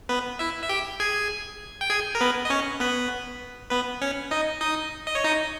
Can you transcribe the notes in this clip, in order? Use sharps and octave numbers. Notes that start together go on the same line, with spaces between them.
B3 B4
E4 E5
E5
G4 G5
G#4 G#5
G5
G#4 G#5
A#4
B3 B4
D#5
C#4 C#5
B3 B4
B3 B4
C#4 C#5
D#4 D#5
D#4 D#5
D#5
C#5
D#4 D#5